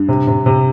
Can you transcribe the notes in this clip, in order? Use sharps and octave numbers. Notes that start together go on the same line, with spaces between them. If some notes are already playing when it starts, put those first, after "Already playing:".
Already playing: G2
C3
C3
C3